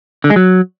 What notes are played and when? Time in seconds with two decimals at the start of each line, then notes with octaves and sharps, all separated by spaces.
0.24 D3
0.30 G#3
0.36 F#3